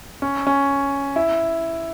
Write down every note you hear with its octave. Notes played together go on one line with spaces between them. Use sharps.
C#4
C#4
E4